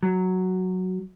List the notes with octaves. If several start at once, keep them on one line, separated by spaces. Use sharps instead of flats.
F#3